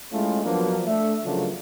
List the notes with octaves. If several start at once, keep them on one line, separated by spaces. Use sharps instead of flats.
G#3 A3 C#4 E4 F4
F3 F#3 A#3 B3 D4
A3 D4 E5
C#3 F3 F#3 A3 A#3 D4